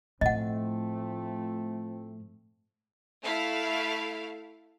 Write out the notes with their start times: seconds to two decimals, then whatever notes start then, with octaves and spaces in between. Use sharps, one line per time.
0.21 A2 F3 A3 C4 D#5 F#5
3.22 A3 E4 F5